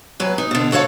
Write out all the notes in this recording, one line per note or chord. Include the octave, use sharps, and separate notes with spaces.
F#3 B4 G#5
D#4
B2 D3
F#4 A4 C#5 F5